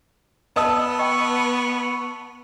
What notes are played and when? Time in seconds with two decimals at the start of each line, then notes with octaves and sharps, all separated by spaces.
0.56 B3 B4 D5 D#5 A5 D#6 E6
0.99 D#5 G5 C#6